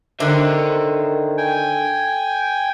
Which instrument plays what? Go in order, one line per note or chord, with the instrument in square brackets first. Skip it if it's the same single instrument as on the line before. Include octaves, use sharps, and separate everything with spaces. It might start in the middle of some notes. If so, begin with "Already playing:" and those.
[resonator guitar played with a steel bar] D3 [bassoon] D#3 [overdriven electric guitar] C5 E5
[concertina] G5 G#5